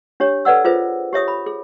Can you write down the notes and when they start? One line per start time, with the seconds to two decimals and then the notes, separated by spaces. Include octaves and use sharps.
0.20 D4 G4 C#5
0.45 A4 B4 D5 F#5 E6
0.65 F4 G#4 B4 C5 E5
1.13 G4 C#5 E5 D#6
1.28 B5
1.46 G#4